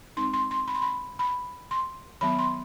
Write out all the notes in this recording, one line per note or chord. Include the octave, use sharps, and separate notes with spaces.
G#3 C4 D#4 C6
C6
C6
B5
C6
B5
B5
C6
D#3 F#3 B3 B5
C6